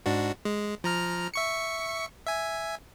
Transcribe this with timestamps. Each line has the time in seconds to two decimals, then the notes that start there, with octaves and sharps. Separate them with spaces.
0.06 G#2 D4 F#4
0.45 G#3
0.84 F3 A#5 F6
1.34 E5 C#6 C#7
2.27 E5 G#5